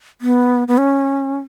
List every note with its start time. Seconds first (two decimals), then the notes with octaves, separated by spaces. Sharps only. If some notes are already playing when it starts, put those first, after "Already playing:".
0.21 B3
0.68 B3
0.78 C#4